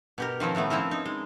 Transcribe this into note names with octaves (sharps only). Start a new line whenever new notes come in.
B2 G4 A#4
D#3 F3 C4 C#4
A2 D#3 A3 B3
F3 C4 C#4 E4 A#4
D#4
G#3